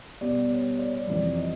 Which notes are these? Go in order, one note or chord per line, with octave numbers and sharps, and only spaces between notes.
B2 G3 B3 D5
C#5
D5
C#5
D5
F2 C3 E3 D5
D#5